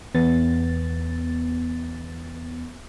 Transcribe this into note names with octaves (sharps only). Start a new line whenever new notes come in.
E2 B3 A6